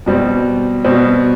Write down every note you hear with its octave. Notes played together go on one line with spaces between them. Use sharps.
B2 G3 C4
B2 G3 C4